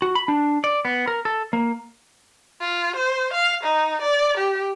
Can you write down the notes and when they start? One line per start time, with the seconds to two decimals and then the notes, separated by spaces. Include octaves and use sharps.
0.02 F#4
0.15 B5
0.28 D4
0.64 D5
0.85 B3
1.08 A#4
1.25 A4
1.53 A#3
2.61 F4
2.96 C5
3.33 F5
3.64 D#4
4.02 D5
4.38 G4